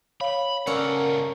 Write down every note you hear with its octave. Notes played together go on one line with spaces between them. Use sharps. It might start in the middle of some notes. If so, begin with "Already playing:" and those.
C#5 F5 B5
C#2 A#3 C#4 A4 A#4 D5 F#5